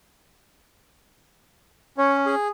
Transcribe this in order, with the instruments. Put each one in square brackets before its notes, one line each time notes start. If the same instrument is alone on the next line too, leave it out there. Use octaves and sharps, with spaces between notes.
[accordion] C#4 [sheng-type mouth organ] C#5
[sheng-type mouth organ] G#4